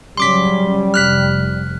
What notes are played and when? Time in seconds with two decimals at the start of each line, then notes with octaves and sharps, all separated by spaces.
0.17 C#3 F#3 G3 C#4 C6 D6 B6
0.94 F1 F6 F#6 B6